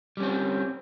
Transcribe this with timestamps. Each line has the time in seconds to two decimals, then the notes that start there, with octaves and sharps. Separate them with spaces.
0.17 G3
0.20 C#4
0.23 C4